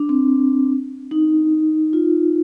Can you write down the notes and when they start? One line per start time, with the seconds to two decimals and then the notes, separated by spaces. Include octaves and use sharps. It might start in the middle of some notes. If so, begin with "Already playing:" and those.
Already playing: D4
0.09 C4
1.11 D#4
1.93 F4